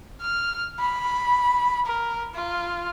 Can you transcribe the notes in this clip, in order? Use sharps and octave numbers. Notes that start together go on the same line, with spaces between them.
F6
B5
A#4
F4